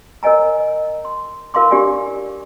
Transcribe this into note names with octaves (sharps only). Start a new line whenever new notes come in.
A#4 C#5 D#5 G#5 A#5
C6
E4 A#4 F5 A5 C6 D6
D4 G4 D5 F5 G#5